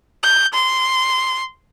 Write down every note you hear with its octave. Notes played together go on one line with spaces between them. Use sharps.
G6
C6